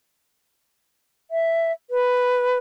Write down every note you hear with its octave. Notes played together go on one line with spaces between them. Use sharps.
E5
B4